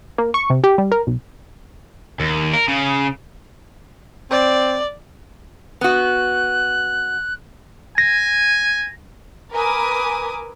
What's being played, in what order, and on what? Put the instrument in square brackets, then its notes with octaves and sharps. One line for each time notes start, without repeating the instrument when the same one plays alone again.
[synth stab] A#3
C#6
C3
G4
G3
A#4
B1
[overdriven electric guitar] D#2
A#4
C#3
[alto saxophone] C4 [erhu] D5
[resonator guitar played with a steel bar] B3 F#4 [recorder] F#6
[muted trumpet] G#5 [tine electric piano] A#6
[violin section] A#4 B4 G#5 D6 D#6